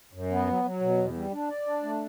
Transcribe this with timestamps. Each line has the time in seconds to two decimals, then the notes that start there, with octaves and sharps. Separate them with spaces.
0.13 F#2
0.31 B3
0.47 F#3
0.64 F#3
0.81 B2
0.98 E2
1.15 G3
1.32 D4
1.49 D5
1.67 D4
1.83 A3